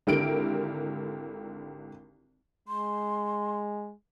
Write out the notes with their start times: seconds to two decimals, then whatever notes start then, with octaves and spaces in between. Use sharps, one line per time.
0.07 G#1 D3 E4 G4 A#4 D7
2.68 G#3 C6